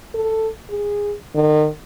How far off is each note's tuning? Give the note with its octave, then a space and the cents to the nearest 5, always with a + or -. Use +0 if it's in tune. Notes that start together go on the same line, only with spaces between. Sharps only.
A4 +10
G#4 -15
D#3 -35